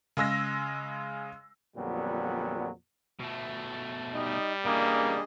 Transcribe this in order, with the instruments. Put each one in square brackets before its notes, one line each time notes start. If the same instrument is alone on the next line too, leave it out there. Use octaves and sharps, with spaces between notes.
[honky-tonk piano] C#3 G#3 E6 A#6
[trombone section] F2 A#2 D3 F#3 G3 B3
[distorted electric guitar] B2 A3
[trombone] G3 [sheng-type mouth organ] D#4 D#5
[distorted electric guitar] C#3 E3 [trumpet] A#3 [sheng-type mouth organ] D4 G#4 D#5